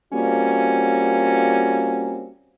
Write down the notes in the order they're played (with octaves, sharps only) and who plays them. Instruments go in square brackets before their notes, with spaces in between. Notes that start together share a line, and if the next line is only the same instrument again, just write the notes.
[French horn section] G3 A#3 C4 C#4 F4 F#4